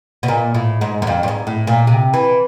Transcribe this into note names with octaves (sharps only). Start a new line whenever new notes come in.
B2
A#2
A2
G#2
F#2
F2
G2
G#2
A2
A#2
C3
E3